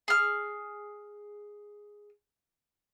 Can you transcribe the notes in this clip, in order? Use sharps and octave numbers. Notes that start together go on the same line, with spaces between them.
G#4 F6